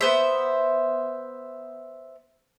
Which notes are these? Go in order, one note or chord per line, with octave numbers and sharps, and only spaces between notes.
B3 C5 E5